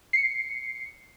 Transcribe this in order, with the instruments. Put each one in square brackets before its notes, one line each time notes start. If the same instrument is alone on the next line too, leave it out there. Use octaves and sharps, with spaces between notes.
[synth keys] C7 C#7